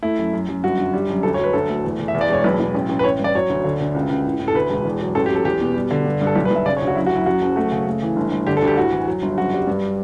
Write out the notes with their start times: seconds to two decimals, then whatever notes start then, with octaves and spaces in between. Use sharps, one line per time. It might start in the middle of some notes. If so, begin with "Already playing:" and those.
0.03 A3 E4
0.19 F#2
0.33 F#2
0.49 F#2
0.63 G1 F#4
0.79 G1
0.94 G3
1.09 F#2
1.23 D2 A4
1.34 C#5
1.39 F#3 B4
1.53 D2 A4
1.69 A3
1.85 E2
2.00 E2
2.08 E5
2.15 E2
2.21 D5
2.29 E1 C#5
2.44 B1 B4
2.60 B1
2.75 A1
2.89 A1
2.99 B4
3.04 A1 C#5
3.19 G2 D5
3.35 F#3 C#5
3.50 D2
3.64 D3
3.80 D2
3.95 C#2
4.09 C#2
4.26 A2
4.39 A2
4.48 A4
4.55 D2 B4
4.70 E1
4.85 E2
5.01 F#3
5.15 A1 A4
5.26 G4
5.30 F#3
5.35 A4
5.45 E2 G4
5.61 B2
5.76 G3
5.91 D3
6.05 G2
6.21 G2
6.27 A4
6.35 B1 G4
6.45 B4
6.51 B1 E5
6.65 C#3 D5
6.77 C#5
6.82 D2
6.87 F#4
6.96 F#2 E4
7.07 F#4
7.12 F#2 E4
7.26 F#2 F#4
7.42 F#1
7.56 A3 F#4
7.72 C#3
7.87 A3
8.02 E3
8.16 G1
8.31 G1
8.47 D3 G4
8.57 A4
8.62 D2
8.67 G4
8.77 A2 F#4
8.92 E3
9.07 F#3
9.22 G1
9.37 F#1 F#4
9.53 G3
9.67 G2